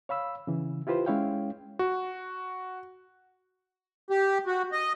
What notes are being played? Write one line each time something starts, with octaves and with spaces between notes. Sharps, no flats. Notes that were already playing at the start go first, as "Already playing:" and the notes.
C#5 F5 B5 E6
C#3 E3
E4 F4 G4 B4 C5
G#3 C#4 E4 C#5 F5 G5
F#4
G4
F#4
D#5